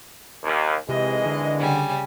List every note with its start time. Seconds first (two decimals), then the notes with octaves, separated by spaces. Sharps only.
0.44 D#2
0.89 G#1 C3 E3 G#3 D#5
1.26 D3
1.59 C#3 G3 G#5